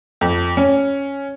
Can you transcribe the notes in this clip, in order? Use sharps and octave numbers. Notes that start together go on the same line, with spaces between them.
F2
C#4